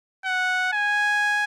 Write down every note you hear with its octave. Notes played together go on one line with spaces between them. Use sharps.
F#5
G#5